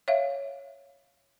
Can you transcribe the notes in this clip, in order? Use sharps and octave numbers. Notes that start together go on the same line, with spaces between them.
C#5 E5 F5